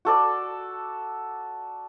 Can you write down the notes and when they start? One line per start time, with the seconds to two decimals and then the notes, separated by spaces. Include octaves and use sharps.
0.05 F#4 A4 D5